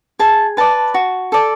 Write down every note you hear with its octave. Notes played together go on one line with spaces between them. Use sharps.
G#4 A5
B4 D5 A5
F#4
A4 D5